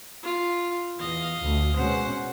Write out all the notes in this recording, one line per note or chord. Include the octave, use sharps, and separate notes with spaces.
F4
E2 D#5 F5
D2
B2 G#3 C#4 C5 F#5